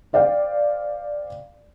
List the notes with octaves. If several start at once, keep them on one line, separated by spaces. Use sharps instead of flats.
C5 D5 F5 G5